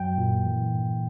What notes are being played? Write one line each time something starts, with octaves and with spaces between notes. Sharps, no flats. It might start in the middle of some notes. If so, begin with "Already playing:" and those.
Already playing: F#2 F#3 G5
A#2
E3
G2